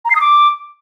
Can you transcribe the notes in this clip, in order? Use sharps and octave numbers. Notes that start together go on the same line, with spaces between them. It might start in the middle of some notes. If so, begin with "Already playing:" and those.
A#5
C7
D#6
D6